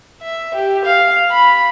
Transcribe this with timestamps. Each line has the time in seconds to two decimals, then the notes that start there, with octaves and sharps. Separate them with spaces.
0.21 E5
0.54 G4
0.85 F5
1.30 B5